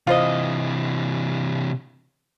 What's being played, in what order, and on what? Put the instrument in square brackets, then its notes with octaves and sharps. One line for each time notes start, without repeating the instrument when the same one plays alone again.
[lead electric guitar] C3 E3 [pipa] F4 C5 D#5